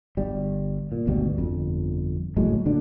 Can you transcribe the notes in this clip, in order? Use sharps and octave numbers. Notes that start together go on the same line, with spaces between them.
G1 G3
A#2
G#1 D2 B2 G3
G1 F2
F#1 A2 F#3 G#3
D1 A#2 D3 D4